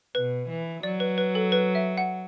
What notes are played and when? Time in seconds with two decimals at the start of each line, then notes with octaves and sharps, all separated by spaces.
0.15 B2 B4
0.49 E3
0.83 F#3 D5
1.00 B4
1.18 B4
1.35 A4
1.52 B4
1.75 E5
1.98 F#5